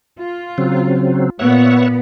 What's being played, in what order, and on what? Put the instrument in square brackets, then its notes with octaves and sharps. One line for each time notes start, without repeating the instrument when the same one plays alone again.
[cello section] F4
[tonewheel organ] C#3 F#3 C4
[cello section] A#2 B3 [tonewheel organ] C#5 E5 F#5